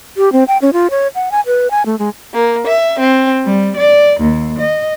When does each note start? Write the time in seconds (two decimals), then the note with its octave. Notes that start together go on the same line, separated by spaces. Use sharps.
0.17 G4
0.32 C4
0.48 G5
0.62 C#4
0.73 F4
0.90 C#5
1.15 F#5
1.31 G#5
1.46 B4
1.71 G#5
1.86 A3
1.99 G#3
2.33 A#3
2.66 E5
2.99 C4
3.45 G3
3.77 D5
4.21 D#2
4.59 D#5